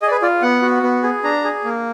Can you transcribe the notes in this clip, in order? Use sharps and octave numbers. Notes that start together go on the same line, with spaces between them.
G#4 D#5
D5
B4
F4 D5
B3 F#5
F#4
B3
G#4
D4 A#5
G#4
A#3